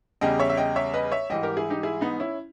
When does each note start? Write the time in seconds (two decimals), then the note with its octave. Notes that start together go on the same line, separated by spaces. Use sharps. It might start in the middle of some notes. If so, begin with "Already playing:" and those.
0.21 E2 C#3 G3 D#5 G5
0.40 C#5 E5
0.50 E5
0.57 D#5 G5
0.76 C#5 E5
0.94 B4 D#5
1.12 C#5 E5
1.30 G#2 E3 G3 D#5 G5
1.43 G4 A#4
1.57 E4 G#4
1.70 D#4 G4
1.83 E4 G#4
2.01 B3 D#4
2.20 C#4 E4